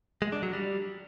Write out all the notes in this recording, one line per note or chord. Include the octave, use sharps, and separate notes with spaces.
G#3
D4
F#3
G3